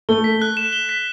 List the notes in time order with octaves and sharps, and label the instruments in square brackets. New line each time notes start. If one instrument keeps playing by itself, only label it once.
[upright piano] A3 [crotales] G7
[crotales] B6
F#6
E7
G7
B6